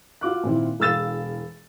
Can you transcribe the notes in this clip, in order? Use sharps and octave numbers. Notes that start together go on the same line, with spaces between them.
F4 F#4 D6 F#6
A#2 D#3 C4 E4
E1 F5 E6 A6 E7